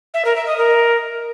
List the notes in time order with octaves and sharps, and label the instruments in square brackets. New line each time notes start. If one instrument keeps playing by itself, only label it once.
[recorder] E5
A#4
E5
D#5
A#4